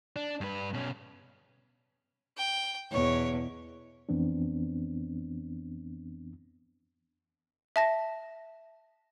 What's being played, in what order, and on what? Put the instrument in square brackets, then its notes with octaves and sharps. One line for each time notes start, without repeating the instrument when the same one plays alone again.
[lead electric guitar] D4
G2 B4
B2 C#4
[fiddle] G5
[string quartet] E2 B2 [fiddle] C#5
[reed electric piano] F2 E3 B3 C4 D4
[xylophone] E5 A5 A#6